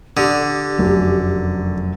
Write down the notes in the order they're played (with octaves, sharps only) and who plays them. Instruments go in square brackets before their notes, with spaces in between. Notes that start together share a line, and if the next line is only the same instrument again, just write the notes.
[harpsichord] D3 [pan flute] G4 [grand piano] D#6
[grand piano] F1 F#2 F#3